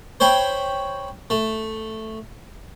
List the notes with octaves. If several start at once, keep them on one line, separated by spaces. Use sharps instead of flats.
C5 C#5 G5 B5
A3